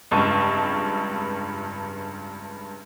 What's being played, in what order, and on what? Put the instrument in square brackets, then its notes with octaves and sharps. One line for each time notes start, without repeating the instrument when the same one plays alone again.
[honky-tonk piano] F1 C#2 G2 A5 C#6 D#7